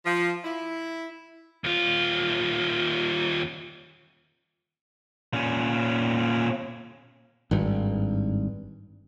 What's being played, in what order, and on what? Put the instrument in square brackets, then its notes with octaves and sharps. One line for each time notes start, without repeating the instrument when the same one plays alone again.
[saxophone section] F3
E4
[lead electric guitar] D#2 F4
A#2 C#4
[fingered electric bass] G#1 G2